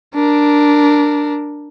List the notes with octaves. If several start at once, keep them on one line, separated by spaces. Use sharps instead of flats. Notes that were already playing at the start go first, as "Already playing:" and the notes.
D4 A#4